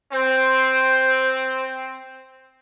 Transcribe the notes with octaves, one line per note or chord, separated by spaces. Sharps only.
C4 C5